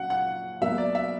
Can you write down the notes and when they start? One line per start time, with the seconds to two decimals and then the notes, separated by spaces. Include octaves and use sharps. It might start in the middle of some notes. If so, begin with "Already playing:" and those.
Already playing: A#2 F#3 C#4 F#5
0.10 F#5
0.61 B2 F#3 A#3 E5
0.78 D5
0.95 E5